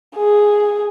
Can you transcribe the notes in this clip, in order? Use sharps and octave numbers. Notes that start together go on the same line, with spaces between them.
G#4